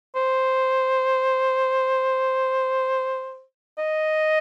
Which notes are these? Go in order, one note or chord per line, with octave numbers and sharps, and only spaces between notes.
C5
D#5